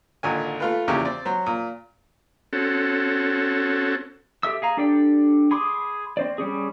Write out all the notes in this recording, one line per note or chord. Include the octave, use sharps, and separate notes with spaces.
G#1 A#2 D3 G#5
A3 F4 B4
E2 A#2 C#3 E4 G4
C4 D5
F#3 C5
A#2
C4 C#4 F#4 A4
G4 A4 E5 E6
G#4 F5 A#5
D4 G4 A4 D5 G5
G#4 B5 C6 D6 D#6
C4 C5 D5
G3 C#4 G4 G#4